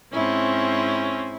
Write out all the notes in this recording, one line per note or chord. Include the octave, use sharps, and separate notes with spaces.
G#2 C4 C#4 E4